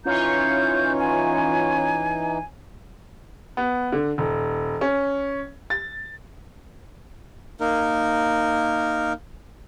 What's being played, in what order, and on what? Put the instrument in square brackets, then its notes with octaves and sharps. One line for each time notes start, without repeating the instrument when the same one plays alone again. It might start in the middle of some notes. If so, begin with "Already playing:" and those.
[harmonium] E3 D#4 [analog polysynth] C#4 F4 C#5 [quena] G6
[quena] G#5
[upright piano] B3
D3
D#1
C#4
A6
[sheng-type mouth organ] A#3 D#4 A#4